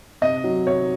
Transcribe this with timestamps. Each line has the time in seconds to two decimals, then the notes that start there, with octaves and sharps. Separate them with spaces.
0.21 C3 D#5
0.44 F#3
0.67 C3 C#5